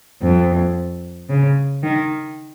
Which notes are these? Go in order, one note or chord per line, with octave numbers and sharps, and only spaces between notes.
F2
C#3
D#3